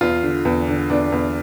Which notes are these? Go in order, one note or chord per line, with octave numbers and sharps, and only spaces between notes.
E2 F4
D3
E2
D3
E2 D4
E2